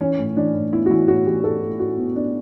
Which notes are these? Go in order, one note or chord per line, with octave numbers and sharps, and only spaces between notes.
E3 C#4
A2
E3 D4
A2
B3 E4
F#4
E3 E4
A2 F#4
E3 G4
A2 A4
A2
A2 F#4
B3
B3 D4